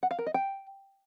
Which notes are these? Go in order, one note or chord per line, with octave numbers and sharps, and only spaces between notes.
F#5
F5
A#4
D#5
G5